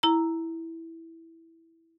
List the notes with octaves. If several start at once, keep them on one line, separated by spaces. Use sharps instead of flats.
E4 A#5